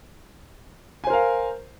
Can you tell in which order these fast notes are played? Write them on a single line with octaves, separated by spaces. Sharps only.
G#5 C5 A#4 F5